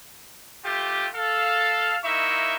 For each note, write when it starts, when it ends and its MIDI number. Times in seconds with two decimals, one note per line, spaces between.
0.64 1.07 57
0.64 1.07 65
0.64 1.07 67
1.15 1.97 69
1.15 1.97 77
2.04 2.56 58
2.04 2.56 63
2.04 2.56 64
2.04 2.56 76
2.04 2.56 85